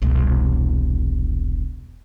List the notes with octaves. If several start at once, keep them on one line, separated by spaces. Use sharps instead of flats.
E1 C2